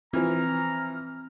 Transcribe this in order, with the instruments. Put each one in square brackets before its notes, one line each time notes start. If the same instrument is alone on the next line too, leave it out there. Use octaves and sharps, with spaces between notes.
[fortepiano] E3 F3 [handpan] C4 [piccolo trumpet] A#5 [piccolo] F6